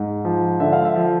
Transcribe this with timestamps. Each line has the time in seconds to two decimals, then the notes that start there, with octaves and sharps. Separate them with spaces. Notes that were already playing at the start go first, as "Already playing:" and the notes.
Already playing: G#2
0.25 F3
0.60 D3 E5
0.73 F5
0.85 E5
0.96 F3